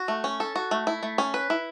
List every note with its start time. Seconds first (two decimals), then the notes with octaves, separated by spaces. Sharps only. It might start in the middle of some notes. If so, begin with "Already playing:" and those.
Already playing: F#4
0.08 A3
0.24 C#4
0.40 A4
0.56 F#4
0.71 A3
0.87 E4
1.03 A3
1.18 C#4
1.34 B4
1.50 E4